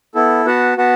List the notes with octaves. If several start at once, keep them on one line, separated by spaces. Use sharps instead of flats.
B3 E4 A4
B3 F#4 B4 F#5 A5
B3 F#4 B4 F#5 A5